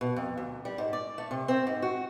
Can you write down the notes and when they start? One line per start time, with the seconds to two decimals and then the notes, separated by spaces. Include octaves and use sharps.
0.01 B2
0.16 F2
0.37 D2
0.65 G3
0.78 G#2
0.93 D5
1.18 A3
1.31 C3
1.48 C4
1.67 G#2
1.82 F#4